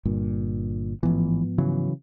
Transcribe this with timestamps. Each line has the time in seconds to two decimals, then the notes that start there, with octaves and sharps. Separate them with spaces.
0.05 G1 G2 A#2
1.03 A1 G#2 E3 F3 B3
1.58 C#3 E3 F#3